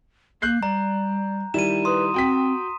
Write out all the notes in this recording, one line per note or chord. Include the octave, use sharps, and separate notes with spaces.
A#3 F#6 G6 C7
G3 D5 A#5
D#3 G3 E4 D#7 E7
B4 C6 D#6
C4 F#4 G5 B6